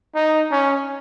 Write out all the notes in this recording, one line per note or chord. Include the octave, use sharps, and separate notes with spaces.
D#4
C#4